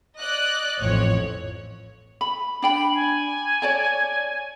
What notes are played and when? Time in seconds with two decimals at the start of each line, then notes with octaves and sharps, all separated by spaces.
0.18 D5 D#5 F#6
0.79 A1 F2 C#5
2.21 B5
2.62 D4 G5 B5 F#7
2.94 G#5
3.62 C#5 D5 A5